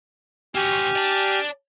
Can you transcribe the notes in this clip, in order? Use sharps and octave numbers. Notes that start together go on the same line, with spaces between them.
C4 F#4 G4 G#5 F6
D5 A5